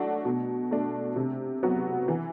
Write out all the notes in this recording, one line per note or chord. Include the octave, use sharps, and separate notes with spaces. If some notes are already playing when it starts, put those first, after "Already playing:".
Already playing: F#3 A3 D4 F#4
B2
A3 D4
C3
F#3 B3 F#4
E3